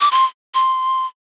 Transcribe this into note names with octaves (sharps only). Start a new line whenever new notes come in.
D6
C6
C6